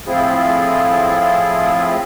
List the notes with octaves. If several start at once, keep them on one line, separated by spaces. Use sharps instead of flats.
A2 F3 C4 E4 F4 G#4